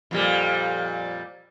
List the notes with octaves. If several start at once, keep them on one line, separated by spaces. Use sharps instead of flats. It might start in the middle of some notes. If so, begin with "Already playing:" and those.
F2 A#2 G3